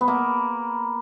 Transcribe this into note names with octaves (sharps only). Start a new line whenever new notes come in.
B3
A#3